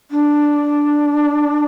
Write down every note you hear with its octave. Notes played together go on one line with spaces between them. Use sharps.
D4